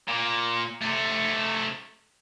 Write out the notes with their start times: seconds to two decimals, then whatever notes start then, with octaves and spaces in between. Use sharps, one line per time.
0.08 A#2
0.81 C3 A3